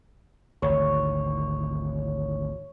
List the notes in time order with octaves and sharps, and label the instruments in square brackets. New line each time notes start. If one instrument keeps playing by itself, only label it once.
[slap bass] G#1 D2 [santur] C#5